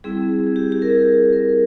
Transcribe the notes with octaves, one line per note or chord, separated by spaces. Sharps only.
G3 C4 E4 G#4
G#4
G4
G4
A#4
G#4
A#4